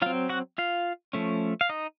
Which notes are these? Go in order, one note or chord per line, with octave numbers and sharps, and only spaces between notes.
F#3 C4 F4 F5
F#4 F#5
F4 F5
F3 A3 C#4
F5
D#4 D#5